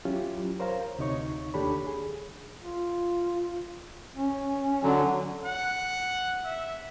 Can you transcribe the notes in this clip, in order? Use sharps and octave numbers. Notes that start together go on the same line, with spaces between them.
F#3 C#4 E4 F4 G4
A#4 C5 C#5 F5 A#5
D2 C3 D#4 C#5 C#6
D#2 D4 G4 A4 C#5 B5
G#4
F4
C#4
D3 F#3
F#5
E5